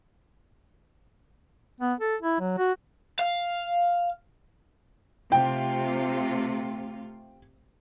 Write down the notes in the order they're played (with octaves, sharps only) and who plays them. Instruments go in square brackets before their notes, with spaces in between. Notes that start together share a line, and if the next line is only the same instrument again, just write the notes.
[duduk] B3
A4
E4
F#3
F#4
[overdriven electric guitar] F5
[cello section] C3 A3 F4 [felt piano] G5